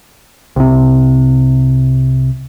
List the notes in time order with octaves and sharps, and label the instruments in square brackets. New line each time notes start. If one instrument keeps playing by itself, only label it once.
[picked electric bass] C2 C3